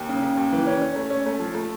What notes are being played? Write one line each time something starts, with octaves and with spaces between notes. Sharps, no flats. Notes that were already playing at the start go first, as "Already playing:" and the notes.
Already playing: D#2
C#3
C#3
D#2
E3
C#4
C#4
A3
C#4
A3
F3
A3